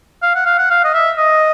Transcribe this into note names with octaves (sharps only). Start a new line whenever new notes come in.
F5
F#5
F5
F#5
F5
D#5
E5
D#5